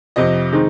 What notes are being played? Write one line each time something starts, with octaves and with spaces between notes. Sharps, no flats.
F2 C3 F3 D#5
D#3 G#3 C4 D#4